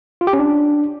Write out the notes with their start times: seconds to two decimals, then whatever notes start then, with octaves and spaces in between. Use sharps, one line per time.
0.21 F4
0.27 G4
0.33 C#4
0.39 D4